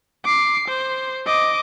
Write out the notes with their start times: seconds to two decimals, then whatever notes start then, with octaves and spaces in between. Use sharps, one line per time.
0.24 D6 C7
0.68 C5
1.26 D#5 D6